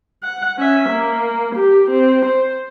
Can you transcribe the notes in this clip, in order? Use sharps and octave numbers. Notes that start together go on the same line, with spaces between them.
F#5
C#4 E5
A#3
G4
C4
C5